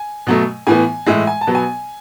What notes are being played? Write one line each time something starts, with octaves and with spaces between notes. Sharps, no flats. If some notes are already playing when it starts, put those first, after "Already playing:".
Already playing: G#5
B2 F#3 A3
A2 E3 B3 G#5
A2 E3 G#3 E5
G#5
A5
B2 F#3 B3
G#5